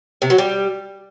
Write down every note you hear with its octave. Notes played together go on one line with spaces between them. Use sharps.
C3
F#3
G3